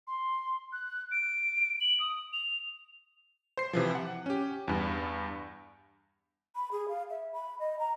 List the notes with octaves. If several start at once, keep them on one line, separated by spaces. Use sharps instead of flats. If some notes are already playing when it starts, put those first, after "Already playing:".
C6
F#6
D7
F#7
D#6
F7
C5 C7
C3 E3 F3
F#5
C#4 G4
E2 G2
B5
G#4
F5
E5
B5
D#5
A#5